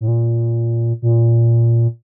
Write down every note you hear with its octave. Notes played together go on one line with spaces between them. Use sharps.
A2
A#2
A#2